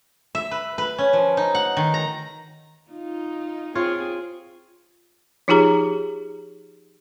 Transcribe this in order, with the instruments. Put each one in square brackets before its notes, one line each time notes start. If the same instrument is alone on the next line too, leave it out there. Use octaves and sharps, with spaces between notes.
[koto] E5
B4
B4
C#4
F3
D#4
F#5
D#3
A#5
[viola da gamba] D#4 F4
[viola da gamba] C4 G#4 [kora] F4 C#5
[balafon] F3 D#4 F4 G4 G#4 A#5